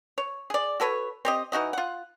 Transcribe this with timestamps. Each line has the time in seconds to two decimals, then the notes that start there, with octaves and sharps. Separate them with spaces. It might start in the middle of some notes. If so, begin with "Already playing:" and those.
0.18 C#5
0.50 G#4 D5
0.80 F#4 A4 B4 C#5
1.25 C4 G4 D#5
1.52 E3 D#4 F#4 D#5
1.73 F4 F#5